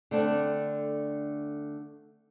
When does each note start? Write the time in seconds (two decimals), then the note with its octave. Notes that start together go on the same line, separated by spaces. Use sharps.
0.11 D3 A3 C4 D4